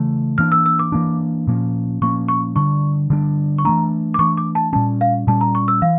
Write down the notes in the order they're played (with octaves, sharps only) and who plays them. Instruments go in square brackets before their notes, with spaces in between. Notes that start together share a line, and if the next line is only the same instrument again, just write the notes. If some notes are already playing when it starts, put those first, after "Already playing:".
Already playing: [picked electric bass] C#3 E3 A3
[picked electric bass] E3 A#3 D4 [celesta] F6
[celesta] E6
E6
D6
[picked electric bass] E3 A#3 D4
A#2 F3 A#3 C#4
[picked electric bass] A#2 F3 A#3 C#4 [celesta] C#6
[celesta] C#6
[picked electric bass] D3 G3 D4 [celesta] C#6
[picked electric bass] D3 G3 D4
[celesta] C#6
[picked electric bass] E3 A3 D4 [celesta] A#5
[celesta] D6
[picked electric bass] E3 A3 D4 [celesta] C#6
[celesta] D6
A5
[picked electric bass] A#2 G3 C#4 [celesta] A5
[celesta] F5
[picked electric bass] A#2 G3 C#4 [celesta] A5
[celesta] A#5
C#6
E6
[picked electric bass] E3 [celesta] F5